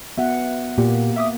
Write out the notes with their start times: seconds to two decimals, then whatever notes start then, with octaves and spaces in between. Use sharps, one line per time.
0.18 B3 F#4 E5 F#5
0.78 A#2 A#3 G4
1.16 E5 D6 D#6